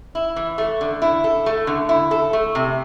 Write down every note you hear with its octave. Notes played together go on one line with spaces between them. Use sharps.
E4
E3
A3
D3
E4
A4
A3
D3
E4
A4
A3
C3